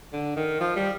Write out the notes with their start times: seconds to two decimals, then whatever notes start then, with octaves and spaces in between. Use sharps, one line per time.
0.13 D3
0.36 D#3
0.60 F3
0.76 G3